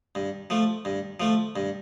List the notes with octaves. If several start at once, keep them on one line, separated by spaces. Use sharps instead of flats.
G2
F3 A3
G2
F3 A3
G2